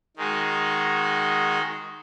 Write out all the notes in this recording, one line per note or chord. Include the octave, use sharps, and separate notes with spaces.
D#3 G#3 D#4 F#4